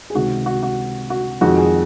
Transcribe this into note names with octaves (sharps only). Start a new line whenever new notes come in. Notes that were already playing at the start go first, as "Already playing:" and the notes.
G#4
C#2 C3 D#3 F#4
F#4
F#4
F#4
F2 D#3 G#3 F#4
G#4